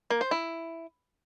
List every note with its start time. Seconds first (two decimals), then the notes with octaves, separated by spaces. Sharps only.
0.10 A#3
0.21 C5
0.31 E4